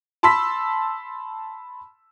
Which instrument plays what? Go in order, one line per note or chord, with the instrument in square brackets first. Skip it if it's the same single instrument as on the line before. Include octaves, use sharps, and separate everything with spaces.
[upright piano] A5 B5 C6 E6 B6